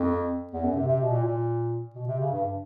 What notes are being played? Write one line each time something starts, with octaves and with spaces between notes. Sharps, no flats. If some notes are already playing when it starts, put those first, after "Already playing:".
Already playing: F2
E2
F#2
C3
C3
B2
A#2
A#2
B2
C3
C#3
G2